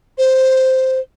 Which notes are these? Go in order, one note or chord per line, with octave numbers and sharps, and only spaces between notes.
C5